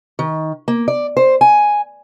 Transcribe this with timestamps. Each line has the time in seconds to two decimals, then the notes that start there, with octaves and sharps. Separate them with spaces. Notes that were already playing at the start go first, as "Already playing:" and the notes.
0.19 D#3
0.68 A#3
0.88 D5
1.17 C5
1.41 G#5